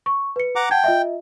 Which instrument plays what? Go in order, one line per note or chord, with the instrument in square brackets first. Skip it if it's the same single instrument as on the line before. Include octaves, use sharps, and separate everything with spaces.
[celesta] C#6
B4 C#7
[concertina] F#5 A#5 D6
[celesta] F#5 A5 G#6 [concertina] G5
[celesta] F4 D#5 E5